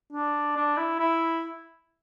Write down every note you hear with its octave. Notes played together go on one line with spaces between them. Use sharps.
D4
D4
E4
E4